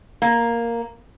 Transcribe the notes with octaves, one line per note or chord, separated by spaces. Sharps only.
A#3